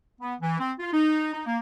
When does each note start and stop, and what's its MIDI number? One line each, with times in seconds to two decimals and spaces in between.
0.21 0.35 59
0.41 0.56 52
0.59 0.72 60
0.80 0.90 65
0.93 1.32 63
1.34 1.43 63
1.46 1.58 58